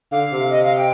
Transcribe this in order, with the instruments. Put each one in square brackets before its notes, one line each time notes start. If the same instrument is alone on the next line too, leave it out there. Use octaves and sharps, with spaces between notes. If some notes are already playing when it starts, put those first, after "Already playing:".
[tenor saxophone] D3 [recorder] F5
[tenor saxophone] C3
[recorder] D#5
F5
G5